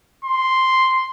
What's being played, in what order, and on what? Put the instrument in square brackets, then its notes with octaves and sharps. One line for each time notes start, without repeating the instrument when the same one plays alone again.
[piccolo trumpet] C6